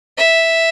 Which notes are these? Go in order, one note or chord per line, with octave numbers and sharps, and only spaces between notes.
E5